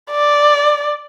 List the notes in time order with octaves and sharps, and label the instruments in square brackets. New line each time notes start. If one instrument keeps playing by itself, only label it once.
[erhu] D5